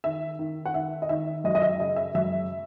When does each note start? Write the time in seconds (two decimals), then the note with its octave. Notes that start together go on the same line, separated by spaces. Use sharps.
0.04 D#3 E5
0.39 D#3
0.66 F#5
0.74 D#3 E5
1.02 D#5
1.09 D#3 E5
1.44 F#2 D#5
1.55 D#5
1.62 E5
1.80 C#3 D#5
1.96 E5
2.14 F#2 E5